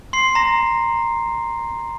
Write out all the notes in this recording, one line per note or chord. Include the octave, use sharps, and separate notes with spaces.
C6 C7
A#5 A#6